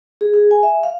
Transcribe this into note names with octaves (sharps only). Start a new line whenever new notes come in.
G#4
G#4
G#5
E5
F5